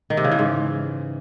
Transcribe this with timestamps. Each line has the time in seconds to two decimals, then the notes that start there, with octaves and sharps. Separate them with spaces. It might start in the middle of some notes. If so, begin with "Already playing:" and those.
0.10 D#3
0.17 C3
0.24 C#3
0.32 E3
0.39 G#2